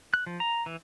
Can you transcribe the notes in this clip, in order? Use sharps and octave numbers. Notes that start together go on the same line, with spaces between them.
F#6
F3
A#5
E3